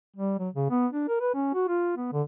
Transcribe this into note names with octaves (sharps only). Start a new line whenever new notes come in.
G3
F#3
C#3
B3
D4
A#4
B4
C#4
F#4
F4
B3
D3